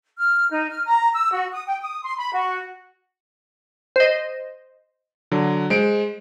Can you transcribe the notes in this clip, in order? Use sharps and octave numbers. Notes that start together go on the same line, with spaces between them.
F6
D#4
F6
A#5
E6
F#4
D#6
G5
D#6
C6
B5
F#4
C5 D#5
D3 F#3
G#3 C5 D7